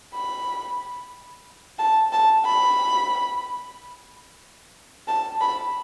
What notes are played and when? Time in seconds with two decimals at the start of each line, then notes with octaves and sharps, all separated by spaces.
0.15 B5
1.79 A5
2.12 A5
2.45 B5
5.08 A5
5.41 B5